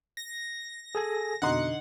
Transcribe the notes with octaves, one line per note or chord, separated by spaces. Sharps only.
A#6
G#4 A4 G#5
F2 B2 D3 D#4 F#5 C6